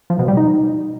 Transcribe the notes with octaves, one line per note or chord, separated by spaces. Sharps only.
F3
B2
G3
D#4